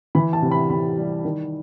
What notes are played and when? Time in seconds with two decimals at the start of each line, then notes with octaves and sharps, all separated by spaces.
0.15 E3 B5
0.33 A5
0.42 C3
0.51 B5
0.69 C3 B5
0.98 G3
1.25 D#3